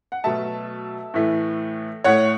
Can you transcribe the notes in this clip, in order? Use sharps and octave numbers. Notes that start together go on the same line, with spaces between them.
F#5
B2 F#3 A3 E5 A5
A2 E3 A3
A2 A3 C#5 F#5